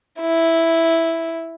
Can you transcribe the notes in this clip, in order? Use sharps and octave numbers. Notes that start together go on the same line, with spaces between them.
E4